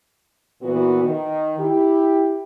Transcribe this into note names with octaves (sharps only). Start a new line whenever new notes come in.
A#2 E3 B3 F#4
D#3
E4 G4